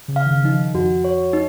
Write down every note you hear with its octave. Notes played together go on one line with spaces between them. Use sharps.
C#3
F5
D#3
C#3
F3 D#4
D#3
F2 F3 F#4
C#5
D#4